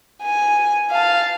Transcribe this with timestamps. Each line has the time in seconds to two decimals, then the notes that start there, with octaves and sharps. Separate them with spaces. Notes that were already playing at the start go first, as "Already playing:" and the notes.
0.23 G#5
0.90 F5 A5